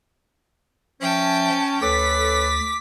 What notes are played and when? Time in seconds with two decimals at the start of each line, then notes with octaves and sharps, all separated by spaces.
1.02 F3 C#4 E5 G5 A5
1.82 D2 C#4 A4 B4 D6 A6 B6